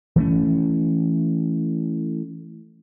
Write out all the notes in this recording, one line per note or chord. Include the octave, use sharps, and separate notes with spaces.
E3 A3 C#4